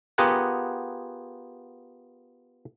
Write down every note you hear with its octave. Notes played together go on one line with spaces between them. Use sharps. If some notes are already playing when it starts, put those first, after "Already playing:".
B3 F4 G4 G#4 A#4 F#5